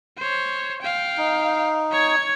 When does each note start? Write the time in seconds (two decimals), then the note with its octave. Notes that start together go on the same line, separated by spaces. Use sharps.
0.18 C5 C#5
0.82 F5 G5
1.18 D#4
1.92 C#5 G#6